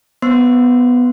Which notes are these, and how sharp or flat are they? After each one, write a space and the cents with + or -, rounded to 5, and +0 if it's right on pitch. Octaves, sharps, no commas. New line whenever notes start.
B3 +0 C5 +0 C6 -15